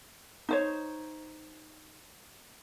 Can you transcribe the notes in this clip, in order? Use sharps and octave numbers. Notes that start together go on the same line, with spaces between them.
D#4 C5 C#5